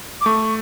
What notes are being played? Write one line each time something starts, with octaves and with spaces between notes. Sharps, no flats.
D6
A3 C#6